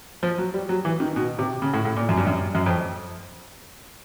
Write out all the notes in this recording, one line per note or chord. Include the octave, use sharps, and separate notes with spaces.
F3
F#3
G3
F#3
E3
D#3
B2
C3
C#3
A2
A2
A#2
F#2
G2
F#2
F#2
F2